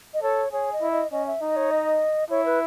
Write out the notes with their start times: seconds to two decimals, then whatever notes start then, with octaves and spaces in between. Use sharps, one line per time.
0.14 D#5
0.22 A4 C#5
0.52 G#4 C#5
0.73 D#5
0.82 E4
0.92 D#5
1.12 C#4 D#5
1.27 E5
1.41 D#4 D#5
1.56 C#5
1.71 D#5
2.30 E4 C#5
2.46 B4